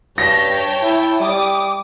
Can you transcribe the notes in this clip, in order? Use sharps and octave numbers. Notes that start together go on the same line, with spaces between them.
G2 C#5 G5 A5 A#6 B6
E4
G3 D6 D#6